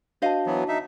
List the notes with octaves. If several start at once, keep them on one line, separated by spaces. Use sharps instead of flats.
D4 F#4 C5 D#5 F5 A5
E3 F#3 B3
D#4 E5